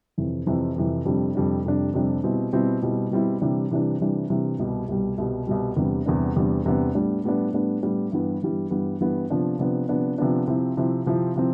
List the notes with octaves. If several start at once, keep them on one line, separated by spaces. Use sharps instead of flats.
F2 C3 E3
F2 C3 E3
F2 C3 E3
F2 C3 G3 D4
F2 C3 G3 D4
F2 C3 G3 D4
F2 C3 G3 D4
B2 G3 C4 E4
B2 G3 C4 E4
B2 G3 C4 E4
B2 G3 C4 E4
C3 E3 G3 D4
C3 E3 G3 D4
C3 E3 G3 D4
C3 E3 G3 D4
C2 B2 G3
C2 B2 G3
C2 B2 G3
C2 B2 G3
E2 C3 G3 B3 D4
E2 C3 G3 B3 D4
E2 C3 G3 B3 D4
E2 C3 G3 B3 D4
A2 G3 B3 D4
A2 G3 B3 D4
A2 G3 B3 D4
A2 G3 B3 D4
G2 E3 G3 B3
G2 E3 G3 B3
G2 E3 G3 B3
G2 E3 G3 B3
C3 F3 B3 D4
C3 F3 B3 D4
C3 F3 B3 D4
C3 F3 B3 D4
C3 F3 C4 E4
C3 F3 C4 E4
C3 F3 C4 E4
C3 F3 C4 E4